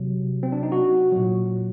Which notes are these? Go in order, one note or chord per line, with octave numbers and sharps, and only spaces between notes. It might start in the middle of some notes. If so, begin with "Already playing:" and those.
Already playing: C3 F#3
C4
D4
D#4
F#4
A#2 F#3